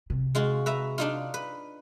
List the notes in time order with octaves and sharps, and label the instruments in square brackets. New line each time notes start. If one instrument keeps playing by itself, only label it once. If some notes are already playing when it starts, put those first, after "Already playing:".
[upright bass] C3
[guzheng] G#3 F4 F#4
B4 E5 A#5
D4 D#4 F4
B4